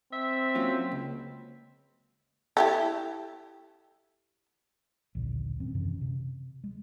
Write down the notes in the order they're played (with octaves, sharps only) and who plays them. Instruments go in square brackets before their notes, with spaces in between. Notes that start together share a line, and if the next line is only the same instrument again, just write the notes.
[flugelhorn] C4 [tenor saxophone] E5
[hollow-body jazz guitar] F#3 C#4 F4 [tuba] A#3
[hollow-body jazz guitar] C#2
[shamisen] E4 G4 A4
[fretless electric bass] A#1 D#2 B2 D3
G1 D#3 C4 C#4
F#2 C3 D#3 E3
C3
G#3